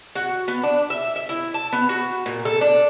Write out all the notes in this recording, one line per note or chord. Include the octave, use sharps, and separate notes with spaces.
F#4
B3
D4
E5
E5
E4
A5
B3
F#4
A#2
A4
D4